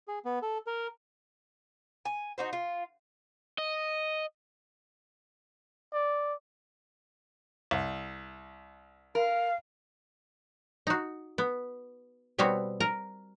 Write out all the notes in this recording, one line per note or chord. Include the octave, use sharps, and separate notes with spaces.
G#4
B3
A4
A#4
G#5
D#4 F#4 C5
F4
D#5
D5
C2
A#4 F5
D#4 F#4
B3
B2 G3 B3 C4 F#4 C#5
A#4 A#5